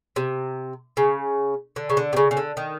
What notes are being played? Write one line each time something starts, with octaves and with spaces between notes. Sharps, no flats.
C3
C#3
D3
C#3
D3
C3
C#3
C#3
D3
D#3